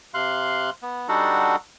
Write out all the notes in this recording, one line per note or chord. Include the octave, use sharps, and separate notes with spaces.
C3 F5 C6 F#6
B3
G3 D4 D#4 F#4 A4 F#5